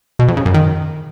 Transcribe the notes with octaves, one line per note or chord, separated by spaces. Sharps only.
B2
F2
C#3
F#2
D#3